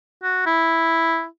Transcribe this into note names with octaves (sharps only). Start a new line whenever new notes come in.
F#4
E4